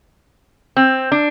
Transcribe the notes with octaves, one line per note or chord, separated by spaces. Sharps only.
C4
D4